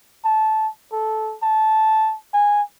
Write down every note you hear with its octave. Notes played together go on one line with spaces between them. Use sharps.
A5
A4
A5
G#5